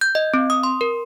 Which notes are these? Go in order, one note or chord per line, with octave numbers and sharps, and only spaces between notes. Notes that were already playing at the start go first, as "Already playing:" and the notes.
G6
D#5
C4
D#6
C6
A#4